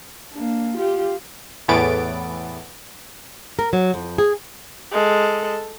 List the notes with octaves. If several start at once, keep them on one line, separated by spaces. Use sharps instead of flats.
A#3 D4
F4 G4
E2 A2 E3 B3 A6 D7
A#4
F#3
F2
G#4
G#3 A4